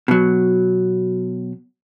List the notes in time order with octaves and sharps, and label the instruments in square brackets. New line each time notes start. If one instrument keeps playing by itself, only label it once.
[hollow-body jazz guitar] B2 F#3